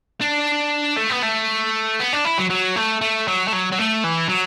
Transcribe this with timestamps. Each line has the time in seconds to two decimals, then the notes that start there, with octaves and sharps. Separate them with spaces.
0.22 D4
0.97 A3
1.11 B3
1.23 A3
2.00 B3
2.13 D4
2.25 E4
2.38 F#3
2.50 F#3
2.76 A3
3.01 A3
3.28 F#3
3.48 A3
3.53 F#3
3.72 F#3
3.79 A3
4.04 E3
4.29 F#3